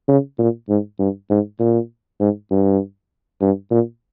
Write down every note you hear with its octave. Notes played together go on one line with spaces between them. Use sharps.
C#3
A#2
G#2
G2
G#2
A#2
G#2
G2
G2
A#2